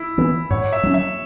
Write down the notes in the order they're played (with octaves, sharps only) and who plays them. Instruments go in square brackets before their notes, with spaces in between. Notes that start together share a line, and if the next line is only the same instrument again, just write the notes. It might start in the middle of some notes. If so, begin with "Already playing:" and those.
Already playing: [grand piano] E4
[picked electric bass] E3 B3
[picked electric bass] G#2 [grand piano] C#5
[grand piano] E5
[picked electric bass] F#3 C#4
[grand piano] E5